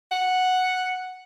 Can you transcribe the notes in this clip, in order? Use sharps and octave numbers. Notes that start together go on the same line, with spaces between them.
F#5